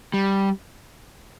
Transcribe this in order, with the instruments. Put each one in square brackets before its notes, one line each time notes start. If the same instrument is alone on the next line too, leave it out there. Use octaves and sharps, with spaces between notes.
[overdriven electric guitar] G3